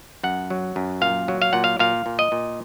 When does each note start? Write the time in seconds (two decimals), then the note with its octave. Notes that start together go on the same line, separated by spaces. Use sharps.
0.23 F#2 F#5
0.50 F#3
0.76 F#2
1.01 A#2 F5
1.28 F#3
1.42 F5
1.53 A#2 F#5
1.64 F5
1.79 A#2 F5
2.06 A#2
2.19 D#5
2.32 A#2